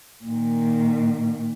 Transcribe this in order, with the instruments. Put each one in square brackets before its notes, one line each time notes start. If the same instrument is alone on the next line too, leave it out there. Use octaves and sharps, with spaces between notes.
[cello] A#2 D#3